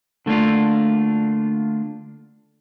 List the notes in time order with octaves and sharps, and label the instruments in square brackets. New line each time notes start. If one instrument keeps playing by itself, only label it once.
[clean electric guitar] D3 A3 A#3 D4 F4